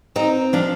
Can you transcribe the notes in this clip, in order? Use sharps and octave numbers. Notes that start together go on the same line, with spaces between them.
C4 D#4
F3 D4